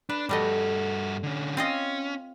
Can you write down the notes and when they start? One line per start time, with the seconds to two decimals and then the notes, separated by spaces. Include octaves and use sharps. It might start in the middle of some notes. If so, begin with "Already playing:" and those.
0.09 D4 B4
0.29 G2 G3 A3 F#4 D#5
1.23 D3 C#4
1.57 C4 C#4 F4 D#5